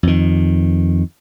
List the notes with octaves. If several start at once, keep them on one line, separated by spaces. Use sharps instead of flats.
F2 D#3